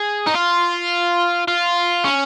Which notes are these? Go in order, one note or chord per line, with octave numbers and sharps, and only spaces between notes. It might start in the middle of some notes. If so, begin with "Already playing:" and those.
Already playing: G#4
D#4
F4
F4
C#4